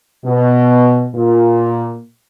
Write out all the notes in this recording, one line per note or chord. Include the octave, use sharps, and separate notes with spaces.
B2
A#2